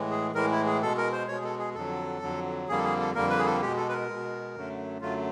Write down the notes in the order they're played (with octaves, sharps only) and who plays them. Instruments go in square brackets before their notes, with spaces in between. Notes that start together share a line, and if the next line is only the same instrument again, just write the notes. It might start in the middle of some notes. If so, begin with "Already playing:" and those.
Already playing: [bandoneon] A2 E3 G#3
G#4
A2 E3 G#3 A#4
E4
G#4
B2 G#3 A4
A#4
C5
B2 G#3 C#5
G#4
A4
G#4
F2 D3 F#3 A4
F2 D3 F#3
F2 D3 G3 A#3 G#4
A4
G#4
A4
F2 D3 G3 A#3 A#4
B4
G#4
A4
B2 G#3 G4
A4
B4
A#4
B2 G#3
F#2 D3 F#3 A3
F#2 D3 F#3 A3 F4